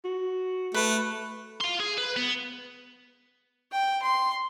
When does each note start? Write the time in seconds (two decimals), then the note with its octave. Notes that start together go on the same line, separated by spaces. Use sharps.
0.05 F#4
0.74 A3 B4
1.60 F5 C6
1.80 G#4
1.98 B4
2.16 B3
3.72 G5
4.02 C6